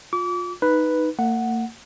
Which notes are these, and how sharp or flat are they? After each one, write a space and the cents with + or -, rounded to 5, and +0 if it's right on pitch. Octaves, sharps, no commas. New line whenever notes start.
F4 +25 D6 -35
D#4 +0 B4 +0
A#3 -45 F#5 +0